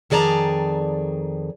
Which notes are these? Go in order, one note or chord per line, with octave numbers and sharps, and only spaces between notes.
F2 D#3 G#4 D5 A5 A#5